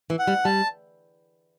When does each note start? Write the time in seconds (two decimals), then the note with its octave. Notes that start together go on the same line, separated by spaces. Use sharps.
0.10 E3
0.19 F#5
0.27 G3
0.45 G3 A5